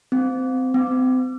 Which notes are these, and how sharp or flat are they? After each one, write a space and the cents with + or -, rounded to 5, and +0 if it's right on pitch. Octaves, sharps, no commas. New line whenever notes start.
C4 -25
C4 -40